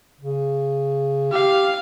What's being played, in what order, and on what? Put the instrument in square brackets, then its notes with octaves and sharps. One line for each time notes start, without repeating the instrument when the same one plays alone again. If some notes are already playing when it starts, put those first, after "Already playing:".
[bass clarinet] C#3
[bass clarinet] G4 [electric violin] F5